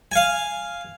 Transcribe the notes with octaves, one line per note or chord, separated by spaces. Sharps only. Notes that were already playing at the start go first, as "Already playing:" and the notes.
F5 G#5